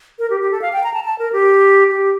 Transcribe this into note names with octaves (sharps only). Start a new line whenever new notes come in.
A#4
G4
G4
A4
F5
G5
A#5
A5
A5
A#4
G4
G4